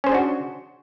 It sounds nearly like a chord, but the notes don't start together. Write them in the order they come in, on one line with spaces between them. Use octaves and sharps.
C#4 C5 G#4 D4 F#4